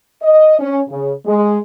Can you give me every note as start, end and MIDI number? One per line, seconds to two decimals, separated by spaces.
0.22 0.56 75
0.59 0.81 61
0.89 1.12 49
1.26 1.59 56